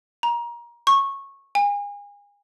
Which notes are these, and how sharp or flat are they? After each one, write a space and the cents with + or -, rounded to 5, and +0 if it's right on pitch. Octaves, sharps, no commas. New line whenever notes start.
A#5 +25
C#6 -15
G#5 -35